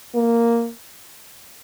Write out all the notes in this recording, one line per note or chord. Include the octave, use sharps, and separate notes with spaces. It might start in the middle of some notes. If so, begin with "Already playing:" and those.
A#3